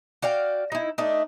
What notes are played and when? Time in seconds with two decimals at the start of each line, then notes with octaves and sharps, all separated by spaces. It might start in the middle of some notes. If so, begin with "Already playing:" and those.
0.22 F#4 D5 F5 G5
0.72 D#4 E4
0.98 A3 D4 D#4